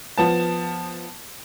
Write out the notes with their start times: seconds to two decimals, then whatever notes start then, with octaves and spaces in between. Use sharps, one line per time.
0.18 F3 B3 A5